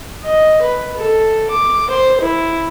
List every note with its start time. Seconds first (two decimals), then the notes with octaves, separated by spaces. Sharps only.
0.23 D#5
0.61 B4
0.96 A4
1.50 D6
1.90 C5
2.21 E4